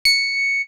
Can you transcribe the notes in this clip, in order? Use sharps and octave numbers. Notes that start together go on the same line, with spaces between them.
C#7